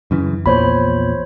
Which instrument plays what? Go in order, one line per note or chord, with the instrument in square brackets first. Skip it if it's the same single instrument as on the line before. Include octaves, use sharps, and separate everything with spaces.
[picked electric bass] F#2 C#3 E3
[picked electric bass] A#1 E2 A#2 [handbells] C5 C#5 B5